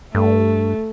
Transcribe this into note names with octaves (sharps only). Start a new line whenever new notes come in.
G2 A3